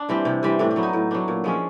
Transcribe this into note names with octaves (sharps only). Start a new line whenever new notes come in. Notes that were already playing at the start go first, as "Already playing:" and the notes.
Already playing: D4
E3 G3 C4
C3
E3 G3 C4
A2 D4
D4
F#3 B3
D#4
A2
F#3 B3 D4
A#2
F3 G#3 C#4